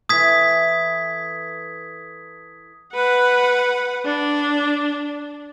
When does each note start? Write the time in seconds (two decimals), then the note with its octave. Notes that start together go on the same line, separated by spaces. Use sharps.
0.09 E3 A4 D#6 G#6 B6
2.94 B4 F#5
4.06 D4